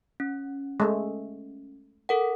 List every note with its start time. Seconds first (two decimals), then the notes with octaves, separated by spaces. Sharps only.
0.20 C#4
0.80 G#3 A3
2.09 A4 A#4 F#5